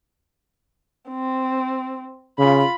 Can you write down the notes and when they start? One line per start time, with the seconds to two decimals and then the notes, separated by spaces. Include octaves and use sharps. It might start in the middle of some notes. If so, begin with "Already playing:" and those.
1.10 C4
2.39 C#3 F4 B5